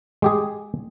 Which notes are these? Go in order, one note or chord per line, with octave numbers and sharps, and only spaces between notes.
G#3 G4 G#4